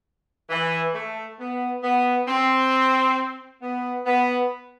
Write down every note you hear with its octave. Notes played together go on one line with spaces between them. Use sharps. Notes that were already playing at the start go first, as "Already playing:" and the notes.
E3
A3
B3
B3
C4
B3
B3